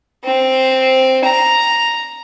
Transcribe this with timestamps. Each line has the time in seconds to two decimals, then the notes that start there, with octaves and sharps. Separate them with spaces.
0.25 C4
1.25 A#5